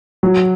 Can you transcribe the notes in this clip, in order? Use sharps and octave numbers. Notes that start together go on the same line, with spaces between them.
F#3